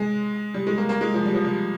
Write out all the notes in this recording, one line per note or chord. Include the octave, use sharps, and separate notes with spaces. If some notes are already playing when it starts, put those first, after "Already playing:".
Already playing: G#3
G3
G#3
A#3
A#3
G#3
F3
G3
F3
G3